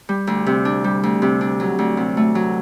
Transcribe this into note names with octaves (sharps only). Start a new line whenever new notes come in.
G3
D2
C3
D4
G3
D2
C3
D4
F#3
D2
C3
A3
F#3